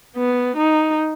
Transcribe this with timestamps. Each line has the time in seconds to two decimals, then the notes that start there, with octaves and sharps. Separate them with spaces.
0.17 B3
0.57 D#4